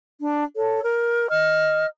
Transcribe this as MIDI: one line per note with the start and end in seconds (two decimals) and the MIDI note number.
0.20 0.44 62
0.55 0.80 69
0.55 0.80 73
0.83 1.27 70
1.29 1.86 75
1.29 1.86 89